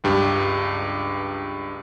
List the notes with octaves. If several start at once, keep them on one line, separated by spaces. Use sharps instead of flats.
C#2 G2 G4